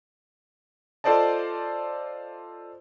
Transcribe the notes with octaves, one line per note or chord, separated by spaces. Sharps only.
F4 A4 C5 D5 D#5 A5